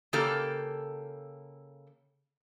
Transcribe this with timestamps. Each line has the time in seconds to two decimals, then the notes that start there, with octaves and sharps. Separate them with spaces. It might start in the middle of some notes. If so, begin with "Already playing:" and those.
0.13 C#3 A#3 G4 A4